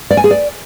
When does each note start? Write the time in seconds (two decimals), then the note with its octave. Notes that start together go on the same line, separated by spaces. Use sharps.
0.11 D5
0.17 G#5
0.24 G#4
0.31 D5